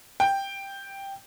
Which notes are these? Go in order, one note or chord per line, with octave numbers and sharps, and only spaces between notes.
G5